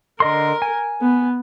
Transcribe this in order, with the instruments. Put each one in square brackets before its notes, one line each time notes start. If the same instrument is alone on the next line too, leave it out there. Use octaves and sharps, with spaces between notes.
[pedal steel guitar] D3 D#5 C6 [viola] A#4
[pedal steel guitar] G#5
[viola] B3